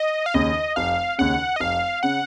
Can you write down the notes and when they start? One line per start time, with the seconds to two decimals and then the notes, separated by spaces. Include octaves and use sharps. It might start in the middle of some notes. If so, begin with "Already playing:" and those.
Already playing: D#5
0.26 F5
0.34 D#2 C#3 D#5
0.76 F1 F5
1.18 D#2 C#3 F#5
1.56 D#5
1.60 F1 F5
2.03 C#3 F#5